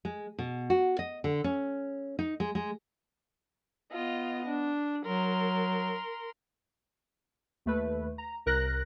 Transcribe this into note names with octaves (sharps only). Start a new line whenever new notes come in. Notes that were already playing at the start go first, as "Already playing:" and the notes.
G#3
B2
F#4
D#5
D3
C#4
D#4
G#3
G#3
B3 F4 D#5
D4
F#3 A#4 C6
D#2 A3 B4
A#5
C2 A#4 F#6 A#6